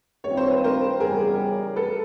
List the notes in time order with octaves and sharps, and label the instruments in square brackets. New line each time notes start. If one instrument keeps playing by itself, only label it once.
[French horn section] G2 D#3 G3 C4 F4 [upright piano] C#5
[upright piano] C5
B4
A#4 C5
[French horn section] F#2 C#3 E3 G3 B3 [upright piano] G#4 A#4
[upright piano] A4 B4